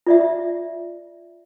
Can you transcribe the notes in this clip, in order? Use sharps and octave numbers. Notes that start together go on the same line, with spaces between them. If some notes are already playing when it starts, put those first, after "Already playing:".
F4 D5 E5